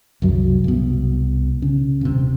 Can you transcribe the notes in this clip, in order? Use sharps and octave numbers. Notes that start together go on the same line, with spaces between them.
C2 F#2 F#3
C2 B2
C#3
D#1 C3